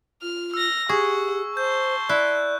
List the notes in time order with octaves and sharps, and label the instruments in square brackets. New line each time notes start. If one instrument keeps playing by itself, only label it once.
[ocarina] F4 [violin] F6
[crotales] E6 [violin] F6 A#6
[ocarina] G4 [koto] G#4 [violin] F#5 [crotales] C#6
[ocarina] C5 [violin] A5 C6 [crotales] G6
[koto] E4 [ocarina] D5 [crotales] F#6